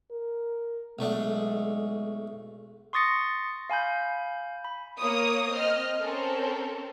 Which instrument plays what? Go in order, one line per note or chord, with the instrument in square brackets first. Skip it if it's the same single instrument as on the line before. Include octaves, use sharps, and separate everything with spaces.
[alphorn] A#4
[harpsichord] B1 A3 D4 [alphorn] G#3
[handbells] C6 C#6 D#6 A6 A#6 C#7
F5 G#5 B5 G6
B5
[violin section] A#3 C#5 D#6
C4 D#5 F6
C4 C#4 A4 A#4